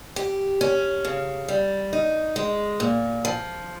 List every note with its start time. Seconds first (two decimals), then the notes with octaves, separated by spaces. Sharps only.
0.16 G4
0.61 C#4
1.05 C#3
1.48 G3
1.93 D#4
2.36 G#3
2.80 A#2
3.25 F3